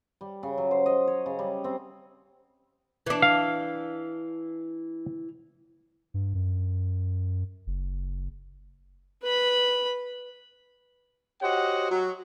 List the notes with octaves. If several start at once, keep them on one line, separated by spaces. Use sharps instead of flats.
G3
C#3
F#3
C5
D#5
C#5
C#3
G3
C4
E3 D4
F5
G2
F#2
F#1
B4 B5
F#4 G4 C5 C#5 D#5 F#5
F#3